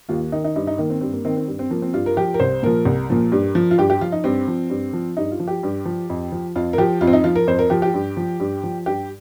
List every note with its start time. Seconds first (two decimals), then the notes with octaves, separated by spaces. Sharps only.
0.09 D#2 F4
0.32 D#3 D#4
0.44 D#4
0.56 G2 D#4
0.67 D#4
0.78 D#3 A#3
0.90 C4
1.01 G2 C4
1.13 A#3
1.25 D#3 C4
1.37 C4
1.47 G2
1.59 C4
1.71 F3 A#3
1.82 C4
1.93 G2 F4
2.06 A#4
2.17 F3 G4
2.34 A#4
2.40 C2 C5
2.63 A#2 F3 A#4
2.85 C2
3.10 A#2 F3
3.32 G2
3.55 F3
3.71 F4
3.78 G2 G4
3.90 G4
4.01 F3 F4
4.12 D#4
4.24 G2 C4
4.48 F3
4.70 G2
4.93 F3
5.17 G2 D#4
5.32 F4
5.40 F3
5.48 G4
5.63 G2
5.85 F3
6.10 F2
6.32 F3
6.56 F2 F4
6.73 A#4
6.78 F3 G4
7.01 F2 F4
7.07 C4
7.13 D#4
7.24 F3 F4
7.36 A#4
7.47 F2 C5
7.59 A#4
7.70 F3 G4
7.82 G4
7.94 G2
8.17 F3
8.40 G2
8.63 F3
8.86 G2 G4